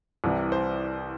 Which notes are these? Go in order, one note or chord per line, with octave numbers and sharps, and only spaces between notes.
C2 C3 E3
C5